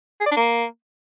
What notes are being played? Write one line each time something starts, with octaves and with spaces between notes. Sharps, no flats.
G#4
D5
D4
A#3